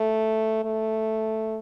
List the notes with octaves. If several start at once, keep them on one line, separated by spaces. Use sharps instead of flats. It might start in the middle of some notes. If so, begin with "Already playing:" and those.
Already playing: A3
A3